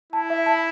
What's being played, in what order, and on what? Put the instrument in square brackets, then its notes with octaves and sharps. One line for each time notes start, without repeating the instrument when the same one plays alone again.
[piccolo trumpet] E4 [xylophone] A5
[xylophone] E5
A5